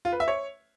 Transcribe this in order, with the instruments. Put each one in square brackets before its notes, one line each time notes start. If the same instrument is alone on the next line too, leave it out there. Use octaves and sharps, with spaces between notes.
[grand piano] F4
B4
E5
C#5